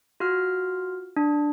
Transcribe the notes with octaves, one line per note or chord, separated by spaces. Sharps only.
F4 F#4 F6
D4